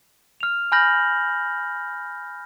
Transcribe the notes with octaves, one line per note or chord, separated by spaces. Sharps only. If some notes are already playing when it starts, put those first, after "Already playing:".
F6 F7
G#5 B5 F6 G6 A#6 F#7